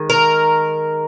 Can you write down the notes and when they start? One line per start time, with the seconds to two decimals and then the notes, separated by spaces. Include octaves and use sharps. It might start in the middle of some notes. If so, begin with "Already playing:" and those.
Already playing: D#3 G#3
0.10 A#4